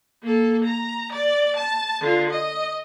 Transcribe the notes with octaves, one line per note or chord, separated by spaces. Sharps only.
A#3 A4
A#5
D5
A5
D3 F4
D#5